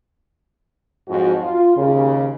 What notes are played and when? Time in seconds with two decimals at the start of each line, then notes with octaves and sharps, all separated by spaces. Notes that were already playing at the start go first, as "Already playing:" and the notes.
1.09 F2 G#2 F#3 F#4
1.41 F4
1.76 D#2 C#3